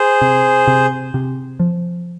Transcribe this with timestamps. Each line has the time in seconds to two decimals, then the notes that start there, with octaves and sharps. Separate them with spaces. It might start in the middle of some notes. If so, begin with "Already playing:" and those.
Already playing: G#4 C5
0.21 C3
0.67 C3
1.14 C3
1.60 F3